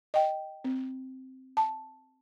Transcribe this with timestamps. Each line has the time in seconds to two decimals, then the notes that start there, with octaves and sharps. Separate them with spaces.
0.14 D#5 G5
0.64 C4
1.57 A5